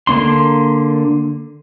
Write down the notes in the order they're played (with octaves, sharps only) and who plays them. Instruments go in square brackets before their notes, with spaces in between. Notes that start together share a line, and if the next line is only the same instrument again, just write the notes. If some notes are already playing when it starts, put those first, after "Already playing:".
[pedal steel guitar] D3 A#3 D4 C6